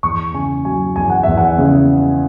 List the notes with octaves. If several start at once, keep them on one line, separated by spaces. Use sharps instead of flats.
E2 C#6
C#3 G#5
F#3 G#5
E2 G#5
F#5
E2 E5
F#5
C#3